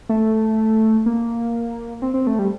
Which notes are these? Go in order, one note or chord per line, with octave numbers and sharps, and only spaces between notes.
A3
A#3
C4
C4
A3
G3